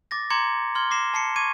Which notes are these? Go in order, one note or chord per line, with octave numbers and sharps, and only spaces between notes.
D6 A6 A#6
A#5 C6 D6 G#6 C#7
C6 F6 G#6 G7
D6 A#6 C7 E7
A5 C7 C#7
C#6 D6 G#6 D#7